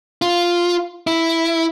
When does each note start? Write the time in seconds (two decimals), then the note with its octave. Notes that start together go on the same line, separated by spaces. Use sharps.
0.22 F4
1.07 E4